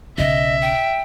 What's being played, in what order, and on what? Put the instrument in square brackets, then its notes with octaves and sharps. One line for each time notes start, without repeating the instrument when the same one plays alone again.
[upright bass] B1 C#3 [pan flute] D#5 [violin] E5
[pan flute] G5